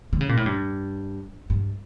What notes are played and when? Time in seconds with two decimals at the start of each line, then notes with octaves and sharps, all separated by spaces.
0.13 D3
0.21 C#3
0.29 A#2
0.37 A2
0.46 G2
1.50 G2